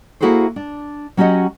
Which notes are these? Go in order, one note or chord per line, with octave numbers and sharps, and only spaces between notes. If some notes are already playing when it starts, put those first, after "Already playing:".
A#3 E4 F#4 G#4 A4 C5
D4
F#3 C#4 F#4 G4 D#5 F#5